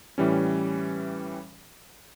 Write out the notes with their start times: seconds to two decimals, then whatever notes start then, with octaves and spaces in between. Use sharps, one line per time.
0.18 A2 E3 G3 C#4